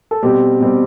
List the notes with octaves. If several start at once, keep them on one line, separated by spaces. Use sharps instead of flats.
A4
B2 G3 C4 G4
B2 G3 C4